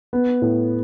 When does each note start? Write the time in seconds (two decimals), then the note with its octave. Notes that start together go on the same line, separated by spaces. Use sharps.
0.13 B3
0.42 A2